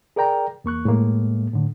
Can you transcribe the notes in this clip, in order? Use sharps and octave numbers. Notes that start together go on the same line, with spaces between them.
G#4 A#4 D5 G5 A#5
E2 A#3 C#6 F#6
A2 G#3 A#3
A2 D3